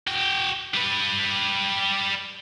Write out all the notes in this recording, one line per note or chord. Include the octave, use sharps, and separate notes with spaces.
F#4 G5
G3 B4